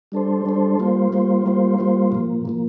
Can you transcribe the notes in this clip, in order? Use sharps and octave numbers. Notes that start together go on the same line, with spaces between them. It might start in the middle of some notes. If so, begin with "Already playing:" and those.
G3 D4 A4 C5
G3 D4 A4 C5
G3 A#3 F4 C5
G3 A#3 F4 C5
G3 A#3 F4 C5
G3 A#3 F4 C5
A#2 F3 A#3
A#2 F3 A#3